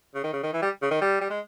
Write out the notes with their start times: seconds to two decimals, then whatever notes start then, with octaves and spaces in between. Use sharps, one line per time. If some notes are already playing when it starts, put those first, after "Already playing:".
0.15 C#3
0.24 D#3
0.33 C#3
0.43 D#3
0.53 E3
0.62 G3
0.82 C#3
0.91 D#3
1.01 G3
1.21 G3
1.30 G#3